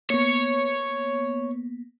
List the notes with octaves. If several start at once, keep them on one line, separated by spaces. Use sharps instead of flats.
A#3 B3 C#5